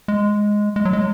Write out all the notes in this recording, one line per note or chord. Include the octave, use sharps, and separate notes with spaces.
G#3
G#3
F#3
G#3